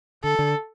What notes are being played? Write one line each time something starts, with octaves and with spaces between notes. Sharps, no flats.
D3 A4
D3